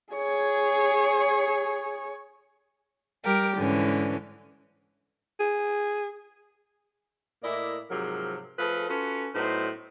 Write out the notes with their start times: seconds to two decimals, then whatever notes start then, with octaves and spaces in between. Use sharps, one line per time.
0.15 G#4 C#5
3.23 G3 G4 A#4
3.57 G#2 D3 E3 C#4
5.40 G#4
7.43 A2 A#3 E4 D5 D#5
7.90 G#2 C3 F3 F#3 A#4
8.59 F3 A3 G#4 A4 B4
8.89 C#4 F4 F#4 A4 B4
9.34 A2 F#3 B3 D#4 C5